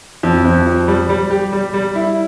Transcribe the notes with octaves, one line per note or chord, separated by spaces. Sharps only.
F2
F2
F3
G3
G3
G4
G3
G3
E4